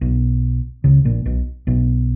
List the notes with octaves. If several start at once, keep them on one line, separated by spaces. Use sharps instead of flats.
B1 B2
C#2 C#3
A#1 A#2
B1 B2
B1 B2